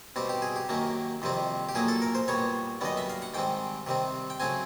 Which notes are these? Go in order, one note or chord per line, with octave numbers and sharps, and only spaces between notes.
B2 G3 C4 G4
G4
G#4
G4
F#2 D#3 F#3 A#3
F2 C3 D#3 G3 C4
G4
A#2 F#3 A#3 G#4
A4
A#4
C5
A#2 G3 B3 C#5
F#2 D3 G3 B3 D#5
E5
F5
F#5
G#2 D#3 G3 C4 G5
C3 D#3 G3 C4
G5
C#3 F#3 A3 C4 G#5